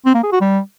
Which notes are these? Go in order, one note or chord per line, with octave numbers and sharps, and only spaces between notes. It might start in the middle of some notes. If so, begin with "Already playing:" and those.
C4
A#3
G#4
F#4
G3